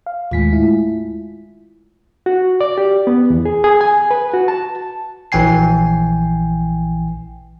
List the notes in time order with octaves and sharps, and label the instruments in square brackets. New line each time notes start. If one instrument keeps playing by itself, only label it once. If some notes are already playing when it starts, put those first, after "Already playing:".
[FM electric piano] F5
[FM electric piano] D#2 A2 B6 [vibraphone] G#3 A3 F4
[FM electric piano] E4
[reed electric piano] F#4
D5
G4
B3
E2
G#4
G#4
G#5
B4
F#4
A5
[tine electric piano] A#1 E3 G5 G#5 C7